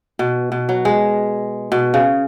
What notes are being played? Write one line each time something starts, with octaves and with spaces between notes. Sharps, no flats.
B2
B2
F#3
G#3
B2
C#3